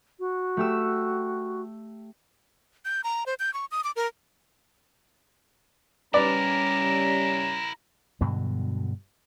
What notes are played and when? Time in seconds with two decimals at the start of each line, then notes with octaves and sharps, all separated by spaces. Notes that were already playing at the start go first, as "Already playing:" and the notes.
0.19 F#4
0.57 A3 G4 E6
2.85 G6
3.04 A#5
3.26 C5
3.39 G6
3.54 C#6
3.71 D#6
3.84 D6
3.96 A#4
6.14 G3 C#4 E4 A#4 B4 D5 A#5
8.21 G2 B2 D3 F#3